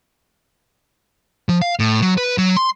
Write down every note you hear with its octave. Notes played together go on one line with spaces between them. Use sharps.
F3
F5
A2
F#3
B4
F#3
C6